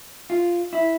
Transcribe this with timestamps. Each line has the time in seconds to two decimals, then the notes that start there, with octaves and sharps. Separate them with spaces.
0.30 F4
0.73 E4